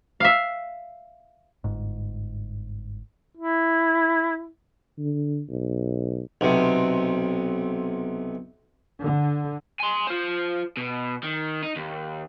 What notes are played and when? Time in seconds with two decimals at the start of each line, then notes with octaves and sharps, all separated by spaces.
0.20 E5 F5
1.64 G1 G#2
3.37 E4
4.98 D3
5.49 B1
6.41 B1 C3
9.00 D3
9.80 G#5 C6
10.07 F4 C5
10.77 B2
11.23 D#3
11.63 D#4
11.76 D#2